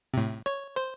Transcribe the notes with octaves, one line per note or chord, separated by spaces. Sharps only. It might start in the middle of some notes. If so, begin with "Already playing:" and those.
A2 C3
C#5
C5